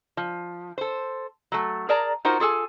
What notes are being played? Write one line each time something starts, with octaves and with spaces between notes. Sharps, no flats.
F3
A4 C5
F#3 A3
G#4 A#4 D5 A5 A#5
D#4 F4 F#4 A#4 C5
F4 G#4 A4 G#5